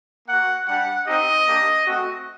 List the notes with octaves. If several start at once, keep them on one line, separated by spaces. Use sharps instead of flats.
A#3 F#4 F#5
G3 D4 G4 F#5
C4 D#4 G4 D#5
A#3 D4 G4
A3 C4 F#4